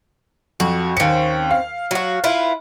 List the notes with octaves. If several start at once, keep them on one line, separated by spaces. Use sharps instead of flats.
F2 F#4
D#2 C4 C#4 C#7
F5
F#3 F#4
E4 F4 B4